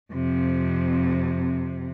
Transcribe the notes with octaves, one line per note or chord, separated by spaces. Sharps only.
F2 C3